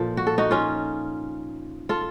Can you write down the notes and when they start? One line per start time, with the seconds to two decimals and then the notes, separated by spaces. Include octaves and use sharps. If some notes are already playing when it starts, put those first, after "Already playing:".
Already playing: A#2 F3 A4
0.17 F#4
0.27 A4
0.38 D#4 F#4
0.51 C#4 F4
1.89 F4 A4